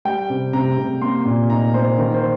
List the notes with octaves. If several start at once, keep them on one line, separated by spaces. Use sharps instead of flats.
G3 G5
C3
C3 A#5
C3
A#3 C6
A#2
D#4 A#5
A#3 C5
D#3 A#4
C5